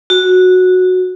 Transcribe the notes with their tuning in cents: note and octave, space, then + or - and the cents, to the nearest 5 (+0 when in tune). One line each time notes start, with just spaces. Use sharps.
F#4 -10